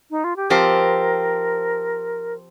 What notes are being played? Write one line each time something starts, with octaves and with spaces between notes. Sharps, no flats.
D#4
F4
G4
F3 C4 G4 A#4 C5